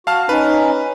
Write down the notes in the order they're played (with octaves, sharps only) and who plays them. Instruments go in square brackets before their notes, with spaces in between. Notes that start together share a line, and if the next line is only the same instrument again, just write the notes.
[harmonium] F#4 [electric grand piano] F5 A5 F6
[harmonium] C#4 D#4 [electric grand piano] B4